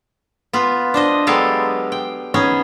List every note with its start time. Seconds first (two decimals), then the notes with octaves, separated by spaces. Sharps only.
0.53 B3 F4 B4
0.94 D4 C5 D#5
1.27 F#3 G#3 B3 G4 A4 F5
1.92 G5
2.34 B3 C#4 D#4 G#4